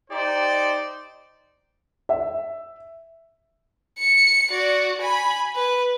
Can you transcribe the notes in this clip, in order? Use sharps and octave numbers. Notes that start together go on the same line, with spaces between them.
D#4 G4 C5 D5
E5
C#7
F#4 D5
G#5 B5
B4